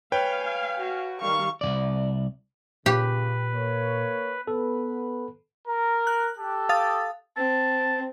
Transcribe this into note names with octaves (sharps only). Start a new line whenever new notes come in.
B4 C#5 F5 G5 G#5
F#4
D#3 G3 F5 C#6
C2 C3 D5
A#2 C#3 G4 B4
A#3 C#5
B3 A4 B4
A#4
F#6
G4 A4
F5 D#6 A6
C4 A5